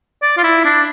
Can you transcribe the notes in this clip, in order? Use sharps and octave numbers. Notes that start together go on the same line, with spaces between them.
D5
F4
E4
D4